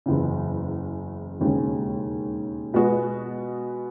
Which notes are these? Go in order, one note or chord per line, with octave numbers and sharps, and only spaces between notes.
F#1 E2 C#3
E1 D#2 C#3 G#3 C#4
B2 G#3 B3 F#4